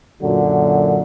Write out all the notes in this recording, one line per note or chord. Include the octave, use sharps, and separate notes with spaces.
F#2 A#2 D3 F#3